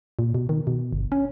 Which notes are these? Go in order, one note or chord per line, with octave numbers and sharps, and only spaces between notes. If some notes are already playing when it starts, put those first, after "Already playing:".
A#2
B2
D#3
B2
G1
C#4